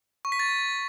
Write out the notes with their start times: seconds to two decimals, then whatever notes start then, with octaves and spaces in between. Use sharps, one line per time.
0.25 C#6
0.32 B6
0.39 A6